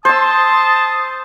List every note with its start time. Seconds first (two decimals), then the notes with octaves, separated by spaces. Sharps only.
0.05 C5 A5 C6 D#6 E6